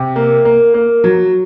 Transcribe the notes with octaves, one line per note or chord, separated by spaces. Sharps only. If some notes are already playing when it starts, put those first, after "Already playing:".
Already playing: C3
A#3
A#3
A#3
F#3